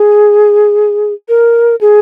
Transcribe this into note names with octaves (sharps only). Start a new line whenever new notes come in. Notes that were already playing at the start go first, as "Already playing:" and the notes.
Already playing: G#4
A#4
G#4